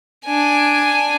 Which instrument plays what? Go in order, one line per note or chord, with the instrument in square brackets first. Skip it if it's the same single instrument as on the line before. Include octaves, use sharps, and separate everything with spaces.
[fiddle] D4 G#5